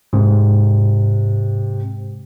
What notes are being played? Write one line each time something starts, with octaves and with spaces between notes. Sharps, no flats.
G#2 C3